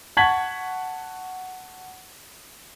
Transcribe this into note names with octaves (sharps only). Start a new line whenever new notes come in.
F#5 A5 C#6 G#6 B6 F#7